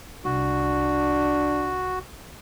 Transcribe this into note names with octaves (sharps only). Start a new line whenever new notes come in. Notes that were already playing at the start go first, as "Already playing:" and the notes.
C2 D4 F#4